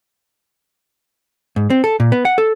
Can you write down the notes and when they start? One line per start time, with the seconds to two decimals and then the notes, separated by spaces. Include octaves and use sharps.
1.56 G#2
1.70 C4
1.84 A4
2.00 A#2
2.12 B3
2.25 F#5
2.38 A4